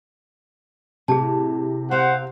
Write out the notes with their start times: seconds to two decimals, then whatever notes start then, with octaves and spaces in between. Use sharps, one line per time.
1.08 A2 C3 G#4 A5
1.91 C4 C5 F5 F#5